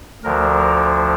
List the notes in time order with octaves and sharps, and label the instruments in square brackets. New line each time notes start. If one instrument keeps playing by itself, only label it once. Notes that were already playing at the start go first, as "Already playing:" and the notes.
[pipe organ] D2 D3 F3 A#4